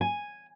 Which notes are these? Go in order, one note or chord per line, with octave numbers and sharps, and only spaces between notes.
G#5